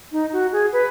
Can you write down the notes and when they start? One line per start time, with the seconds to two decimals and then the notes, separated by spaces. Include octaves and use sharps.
0.12 D#4
0.33 F#4
0.52 G#4
0.72 B4